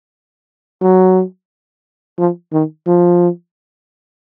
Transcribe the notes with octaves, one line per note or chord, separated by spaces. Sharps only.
F#3
F3
D#3
F3